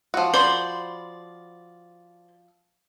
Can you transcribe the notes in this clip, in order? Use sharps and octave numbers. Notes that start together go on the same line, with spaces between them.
F3 F#4
C5 D5 B5